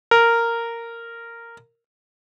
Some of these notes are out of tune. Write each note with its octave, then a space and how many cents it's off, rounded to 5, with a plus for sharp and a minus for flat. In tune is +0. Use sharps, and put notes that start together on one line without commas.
A#4 -10